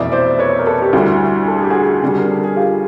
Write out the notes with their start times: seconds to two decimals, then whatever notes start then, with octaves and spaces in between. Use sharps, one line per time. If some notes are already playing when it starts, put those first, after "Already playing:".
Already playing: F1 E2 B2 D5 E5
0.12 C5 D5
0.39 B4 C#5
0.59 A#4
0.66 A4 B4
0.82 G4
0.93 D2 D3 G3 E4 F#4
1.48 A4
1.56 G#4
1.63 G4
1.70 F#4 G#4
2.02 F2 D3 G3
2.18 A#4
2.31 A4
2.44 G#4
2.57 F4 G4